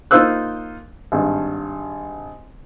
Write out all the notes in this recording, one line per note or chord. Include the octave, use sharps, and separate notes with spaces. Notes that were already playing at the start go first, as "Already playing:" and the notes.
A#3 D#4 F4 C5 E6 F#6
G#1 G2